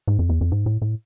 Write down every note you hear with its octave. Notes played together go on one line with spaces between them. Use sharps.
G#2
F2
E2
F2
G#2
A2
A2